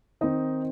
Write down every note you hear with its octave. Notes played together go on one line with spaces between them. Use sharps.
D#3 C4 D#4 D#5